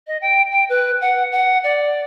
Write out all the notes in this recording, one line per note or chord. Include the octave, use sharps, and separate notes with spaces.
D#5
G5
G5
B4
F#5
F#5
D5